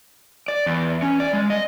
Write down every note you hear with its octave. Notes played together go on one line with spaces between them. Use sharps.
D5
E2
C#4
D5
G#3
D#5